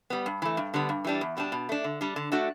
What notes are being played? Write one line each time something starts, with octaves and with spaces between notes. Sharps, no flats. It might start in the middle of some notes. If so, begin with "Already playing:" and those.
G3 B3
G2
E3 A3
G2
D3 G3 B3
G2
E3 G3 D4
E2
B2 G3 D4
B2
A3 D4
D3
G3 D4
D3
A3 D4 F#4